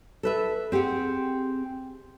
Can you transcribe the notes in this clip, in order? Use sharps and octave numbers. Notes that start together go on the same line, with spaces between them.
A4 B4 E5
C4 G4 G#4 F#5